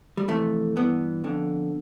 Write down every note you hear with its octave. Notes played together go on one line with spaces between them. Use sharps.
G3
F2 C3 E3 A3
G2 E3 B3
F2 D3